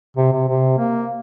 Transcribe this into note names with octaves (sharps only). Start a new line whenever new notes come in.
C3
C3
C3
A#3